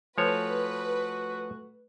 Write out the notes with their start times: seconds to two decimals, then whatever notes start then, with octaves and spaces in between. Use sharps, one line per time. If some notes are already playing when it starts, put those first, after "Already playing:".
0.18 F3 A3 F#4 A4 B4 C#5 G#5